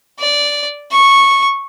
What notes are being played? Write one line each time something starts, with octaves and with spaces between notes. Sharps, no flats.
D5
C#6